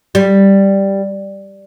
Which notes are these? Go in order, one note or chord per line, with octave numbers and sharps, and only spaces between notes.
G3